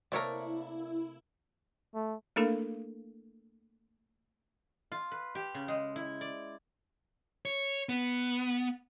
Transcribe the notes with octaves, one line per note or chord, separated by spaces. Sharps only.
C3 A3 A#3 E4 A#4 C#5 D5
A3
A3 A#3 D4 E4 A4 A#4
F4
B4
G4
C#3
G#3
E4
D5
C#5
B3